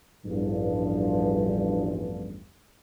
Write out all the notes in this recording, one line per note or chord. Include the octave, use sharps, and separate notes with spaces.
A1 E2 G2 F3